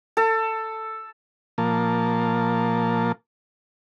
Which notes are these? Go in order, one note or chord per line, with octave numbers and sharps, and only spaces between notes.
A4
A#2 F3 A#3 A5